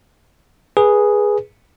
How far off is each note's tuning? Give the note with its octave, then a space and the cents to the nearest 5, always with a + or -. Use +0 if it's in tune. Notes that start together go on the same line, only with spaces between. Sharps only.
G#4 +0 B4 -15